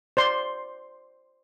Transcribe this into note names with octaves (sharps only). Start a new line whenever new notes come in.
C5 D5 C6